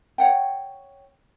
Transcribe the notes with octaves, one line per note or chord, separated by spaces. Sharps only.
C#5 F#5 G5